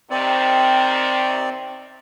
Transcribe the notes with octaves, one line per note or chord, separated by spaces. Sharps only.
C3 D#3 C4 D5